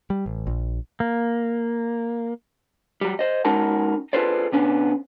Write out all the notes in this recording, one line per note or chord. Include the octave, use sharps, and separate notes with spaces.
G3
A1
A#1
A#3
F#3 G3
C5 D#5
G#3 C#4 D#4 F#4 A#4 A5
F4 G#4 A4 B4 C5 D5
C3 B3 C#4 D4